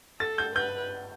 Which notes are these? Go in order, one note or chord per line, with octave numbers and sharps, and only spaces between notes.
A4 A6
G6
B4 G6